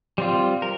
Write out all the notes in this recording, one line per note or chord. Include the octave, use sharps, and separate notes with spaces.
G3 C4 F4
A#4